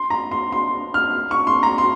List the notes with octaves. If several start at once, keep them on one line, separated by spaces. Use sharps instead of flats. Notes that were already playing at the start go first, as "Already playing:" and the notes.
Already playing: C6
A#5
C6
C6
F6
C#6
C6
A#5
C6